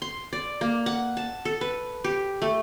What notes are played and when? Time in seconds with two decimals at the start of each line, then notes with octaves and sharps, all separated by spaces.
0.02 C6
0.33 D5
0.61 A#3
0.86 F#5
1.17 A5
1.45 A4
1.61 B4
2.04 G4
2.42 A3